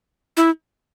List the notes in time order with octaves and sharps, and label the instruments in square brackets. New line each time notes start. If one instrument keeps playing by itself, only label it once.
[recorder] E4